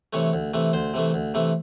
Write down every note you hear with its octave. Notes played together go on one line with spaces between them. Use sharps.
C3 E3 A3 C#5
D2
C3 E3 A3
D2 C5
C3 E3 A3
D2
C3 E3 A3